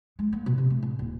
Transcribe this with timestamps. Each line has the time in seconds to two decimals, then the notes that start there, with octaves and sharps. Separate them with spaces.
0.19 G#3
0.33 A#3
0.46 B2
0.58 C3
0.70 A3
0.83 A2
0.99 D#1